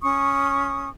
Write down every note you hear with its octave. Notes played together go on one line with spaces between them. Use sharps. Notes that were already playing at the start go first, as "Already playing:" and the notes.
C#4 C#6 D#6